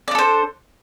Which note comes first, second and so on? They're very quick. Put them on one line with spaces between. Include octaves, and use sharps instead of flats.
D5 D4 A4 C5